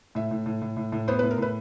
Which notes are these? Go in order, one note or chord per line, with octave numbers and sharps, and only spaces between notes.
A2 E5
A2
A2
A2
A2
A2
B3 C5
B4
A2
A#4
A2 B4